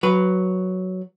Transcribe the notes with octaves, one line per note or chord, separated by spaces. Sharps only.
F#3 B4